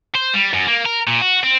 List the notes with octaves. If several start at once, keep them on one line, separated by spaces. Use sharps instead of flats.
C5
G3
F#2
A#3
A#4
A#2
F#4
C4